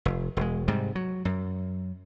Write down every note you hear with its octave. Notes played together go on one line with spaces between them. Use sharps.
F1
E1 G#3
G#2 C3 G3
F#3
F#2